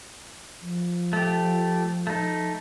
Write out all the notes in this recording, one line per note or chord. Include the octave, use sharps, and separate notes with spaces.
F3
A3 G4
A3 D#4